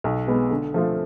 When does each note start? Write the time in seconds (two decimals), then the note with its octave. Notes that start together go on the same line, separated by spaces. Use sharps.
0.04 B1
0.27 B2 G#3 B3
0.51 D3
0.74 F3 A3 F4